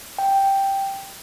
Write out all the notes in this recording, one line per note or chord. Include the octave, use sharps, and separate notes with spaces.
G5